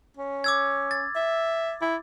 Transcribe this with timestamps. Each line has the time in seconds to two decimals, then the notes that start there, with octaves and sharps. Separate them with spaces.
0.17 C#4
0.44 D6 E6 G#6
0.91 A6
1.16 E5
1.81 E4